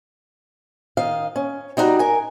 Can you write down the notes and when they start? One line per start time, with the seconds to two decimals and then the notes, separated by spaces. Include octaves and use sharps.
0.97 D#3 D#5 F5
1.36 C#4
1.77 G3 D#4 E4 F#4 A#5
1.99 A#4 G#5